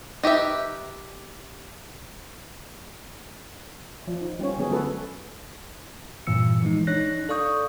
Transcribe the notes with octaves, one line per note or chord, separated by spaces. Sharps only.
D#4 G4 B4 E5
F3
D#4
G3 C4 C#4 C#5
D3 F#3 B3 C#4 G#4
F#3 G#3 F#4 A4 B4
G2 A#2 E3 E6 C#7
E3 F3 G#3 D#4
D4 D#4 C#5 F#6 A#6
A4 D5 F5 C#6 D#6 G6